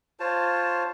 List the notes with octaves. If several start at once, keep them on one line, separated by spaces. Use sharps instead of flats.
F4 C5 C#5 A5